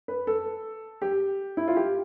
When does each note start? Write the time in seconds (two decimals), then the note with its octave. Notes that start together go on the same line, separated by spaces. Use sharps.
0.08 B4
0.27 A4
1.02 G4
1.57 E4
1.68 F4
1.76 G4